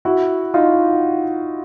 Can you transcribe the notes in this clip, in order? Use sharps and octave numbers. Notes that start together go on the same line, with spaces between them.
E4 F#4
D#4 F4